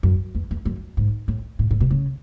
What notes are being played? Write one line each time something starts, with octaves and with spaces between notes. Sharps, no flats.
F#2
E2
E2
F#2
G#2
A2
A2
A2
B2
C#3